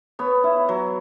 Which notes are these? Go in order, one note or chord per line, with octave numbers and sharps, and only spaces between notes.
B3 C#5
E4
F#3